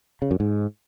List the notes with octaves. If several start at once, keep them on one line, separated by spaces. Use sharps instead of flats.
C#3
F#2
G#2